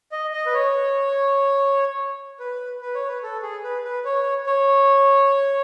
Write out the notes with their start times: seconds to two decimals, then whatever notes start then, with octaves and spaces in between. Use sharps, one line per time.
0.12 D#5
0.33 D#5
0.46 B4
0.54 C#5
2.40 B4
2.81 B4
2.95 C#5
3.08 B4
3.23 A4
3.42 G#4
3.63 B4
3.85 B4
4.05 C#5
4.46 C#5